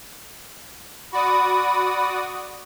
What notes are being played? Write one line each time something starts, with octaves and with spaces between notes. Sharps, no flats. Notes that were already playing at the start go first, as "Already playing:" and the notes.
F#4 D5 B5 D#6